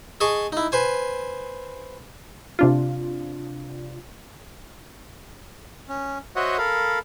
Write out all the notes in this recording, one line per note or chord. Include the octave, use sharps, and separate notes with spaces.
G#4 D#5 A5 C#6
D#4 E4
B4 C5 G#5
C3 D4 F4
C#4
F#4 C5 C#5 D#5 E5 F#5
A4 A#4 F5 B5